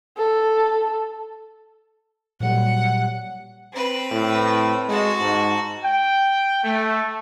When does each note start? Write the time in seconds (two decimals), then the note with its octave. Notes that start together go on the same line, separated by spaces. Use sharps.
0.18 A4
2.40 A#2 F#3 G3 F#5
3.73 C4 B4
4.11 A2
4.89 G#3 F#4 A5
5.20 G#2
5.84 G5
6.64 A3